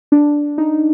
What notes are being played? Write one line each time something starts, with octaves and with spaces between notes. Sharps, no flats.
D4
D#4